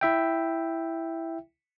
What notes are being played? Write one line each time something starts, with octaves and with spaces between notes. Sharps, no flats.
E4 E5 G5